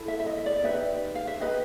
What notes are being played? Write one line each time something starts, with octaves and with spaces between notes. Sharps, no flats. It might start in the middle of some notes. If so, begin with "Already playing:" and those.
Already playing: E4 A4
E5
E5
D#5
D5
D#4 G4 B4 E5
F5
E5
D#4 G4 B4 D#5